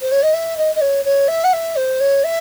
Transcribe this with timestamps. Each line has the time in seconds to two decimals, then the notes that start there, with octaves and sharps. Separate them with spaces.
0.01 C5
0.12 C#5
0.23 D#5
0.34 E5
0.57 D#5
0.75 D#5
0.81 C#5
1.05 C#5
1.28 E5
1.44 F#5
1.53 E5
1.76 C5
2.00 C#5
2.24 E5